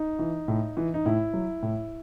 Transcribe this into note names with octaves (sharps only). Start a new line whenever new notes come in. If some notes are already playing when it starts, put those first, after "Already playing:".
Already playing: D#4
E3
A2
E3
D#4
A2 E4
F#3
A2